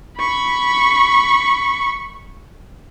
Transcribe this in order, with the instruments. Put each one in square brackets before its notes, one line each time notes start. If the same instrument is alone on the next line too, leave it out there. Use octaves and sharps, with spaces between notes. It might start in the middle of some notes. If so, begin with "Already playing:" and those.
[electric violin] B5 C#6